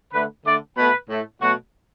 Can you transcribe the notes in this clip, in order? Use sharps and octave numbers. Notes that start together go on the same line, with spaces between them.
D3 A3 B4
D3 A3 D5
B2 A3 B4
A2 A3
B2 F#3 A3 F#4